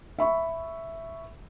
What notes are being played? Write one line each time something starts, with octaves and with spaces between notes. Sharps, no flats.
E5 B5 C#6